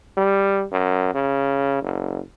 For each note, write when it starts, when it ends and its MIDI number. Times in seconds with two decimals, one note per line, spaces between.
0.17 0.63 55
0.72 1.12 42
1.14 1.78 49
1.82 2.20 30